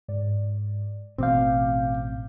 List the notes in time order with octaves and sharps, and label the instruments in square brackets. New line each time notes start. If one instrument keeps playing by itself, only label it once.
[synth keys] G#2 D5
[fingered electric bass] A1 [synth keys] B2 D6 G6 [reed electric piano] C4 F5